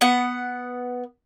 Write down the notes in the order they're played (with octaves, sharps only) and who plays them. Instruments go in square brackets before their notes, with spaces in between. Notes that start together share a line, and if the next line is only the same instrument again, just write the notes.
[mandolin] B3 F#5